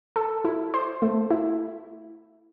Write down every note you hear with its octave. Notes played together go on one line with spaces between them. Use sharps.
A4
E4
C5
A3
E4